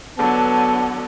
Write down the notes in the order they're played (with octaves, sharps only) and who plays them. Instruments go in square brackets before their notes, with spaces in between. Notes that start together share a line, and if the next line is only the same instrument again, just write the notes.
[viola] D3 F#3 [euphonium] B3 [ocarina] A5